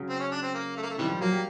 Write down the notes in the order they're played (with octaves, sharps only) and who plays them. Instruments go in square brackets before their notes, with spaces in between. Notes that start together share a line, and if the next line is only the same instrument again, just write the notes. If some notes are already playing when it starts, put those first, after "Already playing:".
Already playing: [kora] C#3 F#3
[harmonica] C4
C#4
D4
C4
A#3
A3
A#3
A3
[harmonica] C3 E3 G3 [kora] D#3
[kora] F3
[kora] F#3 [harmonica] A#3
[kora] G3